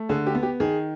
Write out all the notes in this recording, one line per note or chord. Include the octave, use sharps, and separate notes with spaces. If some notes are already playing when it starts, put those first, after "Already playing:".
Already playing: A3
D3 G#4
G4
B3
G4
D#3 G#4